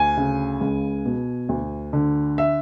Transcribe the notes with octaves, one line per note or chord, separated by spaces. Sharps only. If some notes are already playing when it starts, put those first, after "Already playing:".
Already playing: D2 G#5
C#3
C#2
B2
D2
D3
E5